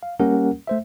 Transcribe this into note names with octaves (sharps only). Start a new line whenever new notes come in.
F5
G3 A#3 C#4 G4 A#4 F#5
A3 C5 E5